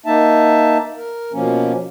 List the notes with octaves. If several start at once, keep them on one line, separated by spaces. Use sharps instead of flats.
A#3 D#4 E5 A5
A#4
B2 F3 A#3 C#4